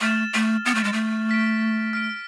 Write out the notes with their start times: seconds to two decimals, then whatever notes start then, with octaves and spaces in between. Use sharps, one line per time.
0.01 A3 F6 A6 E7
0.34 A3
0.65 B3 F6 A6 E7
0.75 A3
0.84 G#3
0.93 A3
1.29 F6 B6 D7
1.93 F6 B6 D7